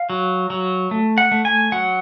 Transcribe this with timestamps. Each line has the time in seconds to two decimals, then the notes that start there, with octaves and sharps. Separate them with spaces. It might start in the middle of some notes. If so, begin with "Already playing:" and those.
Already playing: F5
0.10 F#3
0.50 F#3
0.91 A3
1.18 F#5
1.32 A3
1.45 G#5
1.72 F#3 F#5